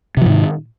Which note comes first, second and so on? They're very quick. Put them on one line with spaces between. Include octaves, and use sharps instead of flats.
C3 F3 G#2 D#3